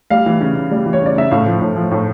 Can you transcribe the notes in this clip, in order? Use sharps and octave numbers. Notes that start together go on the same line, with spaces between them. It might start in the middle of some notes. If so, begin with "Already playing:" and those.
G3 F5
E3
C#3
C#3
G3
E3
C#5
C#3 D5
C#3 E5
A2 F5
F3
A2
F3
A2